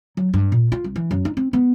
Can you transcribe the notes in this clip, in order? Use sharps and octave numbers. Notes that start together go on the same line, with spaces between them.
F#3
G2
A#2
F4
C2
E3
F#2
D#4
C4
B3